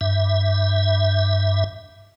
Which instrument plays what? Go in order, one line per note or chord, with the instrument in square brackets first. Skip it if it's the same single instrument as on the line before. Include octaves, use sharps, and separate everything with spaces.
[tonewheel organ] G2 E5